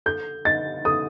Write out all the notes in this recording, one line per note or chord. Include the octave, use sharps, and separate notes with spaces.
A4 G6
D#5 A6
A4 D#6